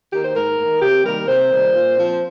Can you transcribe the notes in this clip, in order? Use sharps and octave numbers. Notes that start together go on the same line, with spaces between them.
D#3 A#3 G4
C5
G#2 A#4
D#3 A#3
C3 G4
D#3 G3 A#3 A#4
C3 C5
D#3 G3 A#3
A#2
F3 C4